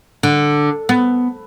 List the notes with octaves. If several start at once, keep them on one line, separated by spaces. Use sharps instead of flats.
D3
B3